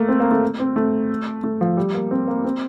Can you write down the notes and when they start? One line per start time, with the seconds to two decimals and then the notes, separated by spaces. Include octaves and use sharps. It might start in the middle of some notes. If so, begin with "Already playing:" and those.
Already playing: A3 A#3
0.08 C4
0.20 A#3
0.31 A3
0.59 C4
0.76 A3
1.44 A3
1.61 F3
1.77 G3
1.94 A#3
2.11 C4
2.28 A#3
2.44 C4